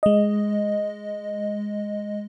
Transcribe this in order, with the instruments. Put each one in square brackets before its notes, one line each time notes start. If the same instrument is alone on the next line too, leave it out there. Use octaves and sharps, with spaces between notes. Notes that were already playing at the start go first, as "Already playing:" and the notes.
[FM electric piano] G#3 D#5